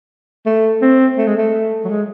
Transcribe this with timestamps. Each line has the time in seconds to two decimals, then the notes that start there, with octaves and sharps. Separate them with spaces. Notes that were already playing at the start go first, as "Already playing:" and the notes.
0.46 A3
0.82 C4
1.18 A3
1.27 G#3
1.37 A3
1.85 F#3
1.90 G#3